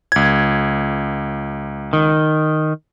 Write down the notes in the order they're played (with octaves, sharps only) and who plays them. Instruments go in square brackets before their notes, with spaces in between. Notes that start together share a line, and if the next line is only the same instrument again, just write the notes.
[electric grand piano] C#2 G#6
[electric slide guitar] D#3